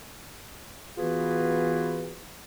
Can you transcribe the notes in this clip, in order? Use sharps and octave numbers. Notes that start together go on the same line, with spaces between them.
E3 B3 F4 F#4 G#4 B4